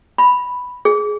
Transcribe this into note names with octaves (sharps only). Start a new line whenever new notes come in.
B5
G#4